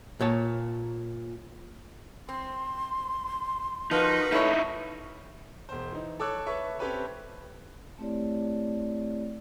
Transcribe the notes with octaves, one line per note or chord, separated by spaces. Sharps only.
A#2 C#5 A5
C4 C6
F3 D#4 F#4 A#4 B4
A3 D#4 E4 C#5 B5
E1 C5
E3 D#4
A4 C#5 D6 E6 F#6
A4 B4 C#5 E5 C#6
C4 C#4 G4 A4 B4 C#5
A3 C4 E4 G4 C#5 D5